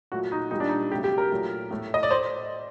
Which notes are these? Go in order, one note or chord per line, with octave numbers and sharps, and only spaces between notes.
A#2 F#3 A3 F#4
D#4
A#2 G3 D#4
D4
D#4
C3 F#3 A3 G4
G4
A#4
A#2 F#3 A3
A2 A3
D#5
D5
C5